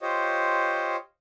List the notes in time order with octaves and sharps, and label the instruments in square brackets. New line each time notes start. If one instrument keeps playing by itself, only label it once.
[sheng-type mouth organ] F4 G4 C5 C#5 D#5